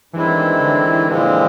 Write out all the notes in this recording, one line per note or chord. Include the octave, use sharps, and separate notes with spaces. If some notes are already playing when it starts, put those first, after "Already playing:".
G2 D#3 E3 G#3 C4 E4
D3
A#2 D3 F3 G#3 C4